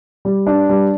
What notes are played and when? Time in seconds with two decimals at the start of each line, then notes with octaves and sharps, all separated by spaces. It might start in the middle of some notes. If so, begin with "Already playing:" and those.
0.25 G3
0.47 D4
0.69 G3